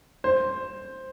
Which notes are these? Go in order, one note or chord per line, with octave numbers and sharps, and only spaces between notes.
C5